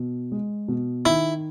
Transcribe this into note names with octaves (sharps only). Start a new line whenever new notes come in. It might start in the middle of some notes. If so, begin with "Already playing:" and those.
Already playing: B2
G#3
B2
D#3 E4